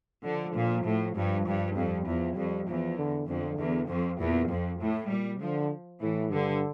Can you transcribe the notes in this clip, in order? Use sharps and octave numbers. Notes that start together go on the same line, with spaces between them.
D3 F3
A#2
A2
G2 F3
G2
F2 G3
E2 F3
F2 G3
E2 F3
D3
F2 D3
E2
F2
E2 A#2
F2
A2
A#2 G3
D3 F3
A2 E3
G2 D3